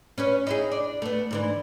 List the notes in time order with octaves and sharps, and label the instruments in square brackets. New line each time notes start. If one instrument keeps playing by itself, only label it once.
[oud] C#4 B4 C#5
D#4 E4 G#4
D4
A3 B3
G#2 D3 E3